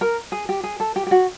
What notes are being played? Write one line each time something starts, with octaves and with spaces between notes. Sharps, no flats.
A#4
G#4
G4
G#4
A4
G4
G4
F#4